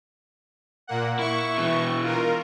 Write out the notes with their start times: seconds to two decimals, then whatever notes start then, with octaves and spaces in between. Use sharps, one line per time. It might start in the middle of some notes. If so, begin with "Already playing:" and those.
0.87 A#2 A#3 F#5
1.19 E4 C#6
1.58 B2 E3
2.03 F4 A#4